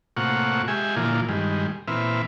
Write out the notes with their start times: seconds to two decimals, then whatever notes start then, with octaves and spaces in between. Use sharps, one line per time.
0.17 A2 C3 A#3 F4 F#5 C#6
0.68 G#3 G4 E5 G#5
0.96 A#2 D3 E3 F3 A#3 F4
1.29 G2 D#3 G3 G#3
1.88 A#2 E3 C4 B4 E5 F6